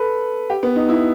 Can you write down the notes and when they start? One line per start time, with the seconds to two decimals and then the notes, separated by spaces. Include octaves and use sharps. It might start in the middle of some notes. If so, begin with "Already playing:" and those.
Already playing: A4 B4
0.50 G4
0.63 B3
0.76 D#4
0.89 E4